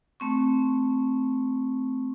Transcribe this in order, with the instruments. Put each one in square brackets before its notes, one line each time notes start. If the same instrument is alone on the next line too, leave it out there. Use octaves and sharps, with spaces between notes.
[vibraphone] A3 C4 C#6